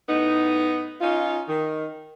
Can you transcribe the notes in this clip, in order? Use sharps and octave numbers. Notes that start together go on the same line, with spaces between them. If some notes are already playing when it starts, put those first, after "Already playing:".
A2 B3 D#4
C#4 D#4 F4
D#3